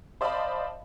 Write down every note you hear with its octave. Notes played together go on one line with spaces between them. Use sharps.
C5 D5 D#5 F5 A5 B5